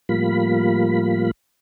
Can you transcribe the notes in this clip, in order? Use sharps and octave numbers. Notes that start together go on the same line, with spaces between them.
A2 F3 G3 A#3 F4 B5